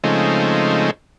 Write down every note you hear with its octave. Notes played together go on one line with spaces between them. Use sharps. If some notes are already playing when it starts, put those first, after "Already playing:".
C#3 F3 G#3 A3 C4 D#4